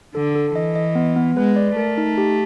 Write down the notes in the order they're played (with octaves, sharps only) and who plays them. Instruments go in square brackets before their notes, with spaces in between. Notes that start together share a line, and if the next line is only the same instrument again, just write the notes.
[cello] D3 [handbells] A4
[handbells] A4
[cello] E3 [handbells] D#5
[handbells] D#5
B3
B3
[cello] G#3 [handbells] B4
[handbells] D5
[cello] A3 [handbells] A#4
[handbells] D#4
G4